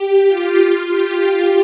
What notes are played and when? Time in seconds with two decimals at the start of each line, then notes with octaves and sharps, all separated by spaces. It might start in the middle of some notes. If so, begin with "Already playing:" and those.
Already playing: G4
0.28 F4
0.90 G4